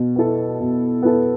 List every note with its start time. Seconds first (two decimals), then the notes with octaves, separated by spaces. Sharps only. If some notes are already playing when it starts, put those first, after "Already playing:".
Already playing: B2
0.16 B3 E4 A4
0.60 B2
1.03 B3 E4 A4